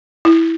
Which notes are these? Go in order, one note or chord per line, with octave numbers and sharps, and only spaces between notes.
E4